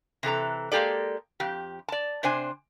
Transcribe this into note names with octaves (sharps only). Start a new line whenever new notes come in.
C3 E3 A4 A#5
G#3 A#3 G4 A4 D5
F2 G4
D5 A5
C3 D4 C5 G#5